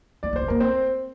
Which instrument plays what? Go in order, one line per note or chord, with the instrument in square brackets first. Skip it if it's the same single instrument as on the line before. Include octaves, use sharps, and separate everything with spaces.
[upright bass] A3 [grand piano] D5
[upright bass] A#3
[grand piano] C5
[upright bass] C4
[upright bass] A#3 [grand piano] A#4
[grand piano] C4 C5